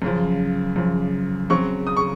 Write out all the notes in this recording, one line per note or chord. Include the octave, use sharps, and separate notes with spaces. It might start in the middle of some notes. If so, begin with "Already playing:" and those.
F#2 C#3 F3
F#2 C#3 F3
C#3 F#3 C4 C#6
D#6
C#6